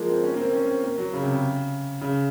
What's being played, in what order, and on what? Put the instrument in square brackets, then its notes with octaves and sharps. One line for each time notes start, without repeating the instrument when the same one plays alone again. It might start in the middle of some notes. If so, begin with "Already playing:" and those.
Already playing: [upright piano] F3 G#3 A#3
C4
C#4
A#3
C4
C#4
C4
A#3
F#3
C#3
C3
C#3
C#3